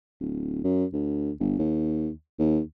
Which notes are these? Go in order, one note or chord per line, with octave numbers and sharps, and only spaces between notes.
D1
F#2
D2
G1
D#2
D#2